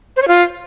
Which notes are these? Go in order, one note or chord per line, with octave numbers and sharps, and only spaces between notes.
C5
C#5
F4